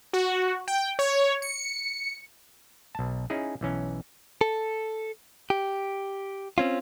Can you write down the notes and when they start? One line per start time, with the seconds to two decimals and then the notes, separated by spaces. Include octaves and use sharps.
0.13 F#4
0.68 G5
0.99 C#5
1.42 C#7
2.95 B1 A5
3.30 C#4 D#4 E4 G#4
3.61 B1 E3 C#4
4.41 A4
5.50 G4
6.58 C4 C#4 F4